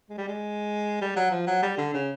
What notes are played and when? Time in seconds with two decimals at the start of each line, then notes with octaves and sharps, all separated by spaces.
0.09 G#3
0.18 G3
0.28 G#3
1.01 G3
1.16 F#3
1.31 F3
1.47 F#3
1.62 G3
1.77 D3
1.94 C#3